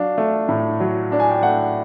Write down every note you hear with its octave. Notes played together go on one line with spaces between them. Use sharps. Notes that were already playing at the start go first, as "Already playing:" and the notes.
Already playing: F#3 D4 F5
A3
A2
F#3
D4
G#5
G5
A3 F#5